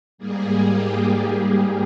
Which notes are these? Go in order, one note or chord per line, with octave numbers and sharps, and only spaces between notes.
G#2 G3 A#3 G#4
G4
G#4